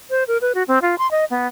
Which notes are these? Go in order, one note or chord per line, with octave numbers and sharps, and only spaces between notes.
C5
A#4
B4
F#4
C4
F4
C6
D#5
B3